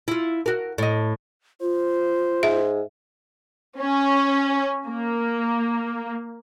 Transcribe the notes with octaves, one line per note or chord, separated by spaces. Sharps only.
E4 F4
F#4 A#4
A2 D#5
F4 C5
G#2 E5
C#4
A#3